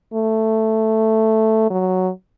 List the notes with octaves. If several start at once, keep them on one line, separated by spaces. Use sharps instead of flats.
A3
F#3